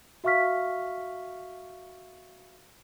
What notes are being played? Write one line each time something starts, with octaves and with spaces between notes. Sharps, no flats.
F#4 E5 F5 C#6 F6 B6